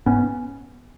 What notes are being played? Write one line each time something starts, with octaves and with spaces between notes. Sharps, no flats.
G#2 B3 C#4